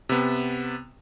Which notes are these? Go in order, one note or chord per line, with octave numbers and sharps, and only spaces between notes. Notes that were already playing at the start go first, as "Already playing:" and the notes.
C3 B3